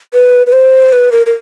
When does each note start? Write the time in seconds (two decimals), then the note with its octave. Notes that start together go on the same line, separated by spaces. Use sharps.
0.14 B4
0.47 B4
0.52 C5
0.93 B4
1.12 A#4
1.26 A#4